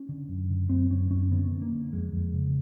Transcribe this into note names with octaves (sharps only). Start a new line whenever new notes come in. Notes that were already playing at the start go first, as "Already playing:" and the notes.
Already playing: C#4
D3
F#2
D3
F#2 C4
F#2 C#4
F#2 C#4
D3 B3
D3
A#3
D3
F2 G#3
F2
C#3